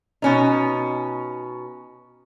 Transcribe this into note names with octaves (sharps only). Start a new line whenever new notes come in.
B2 C#4 D#4